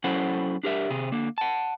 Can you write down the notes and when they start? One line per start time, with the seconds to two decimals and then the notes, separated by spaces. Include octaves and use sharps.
0.04 F#3 C#4 E4 A4 C5 F#5
0.63 D4 G4 A#4 E5
0.90 C3 G#4
1.12 D3 A#3
1.38 F#5 A5